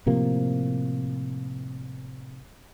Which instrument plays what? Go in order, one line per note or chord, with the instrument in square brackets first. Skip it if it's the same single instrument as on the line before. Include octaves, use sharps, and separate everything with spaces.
[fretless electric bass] A2 C3 F3 A#3